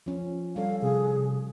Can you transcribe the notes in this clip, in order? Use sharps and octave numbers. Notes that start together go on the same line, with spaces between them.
F3 C#4
G3 C#4 A4 F5
C3 G#4